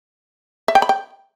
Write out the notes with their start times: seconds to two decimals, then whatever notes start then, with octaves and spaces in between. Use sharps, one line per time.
0.68 E5
0.75 G5
0.82 B5
0.89 G5